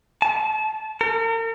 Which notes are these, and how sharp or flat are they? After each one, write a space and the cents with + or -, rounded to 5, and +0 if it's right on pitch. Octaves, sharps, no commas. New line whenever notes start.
A5 -30
A#4 -40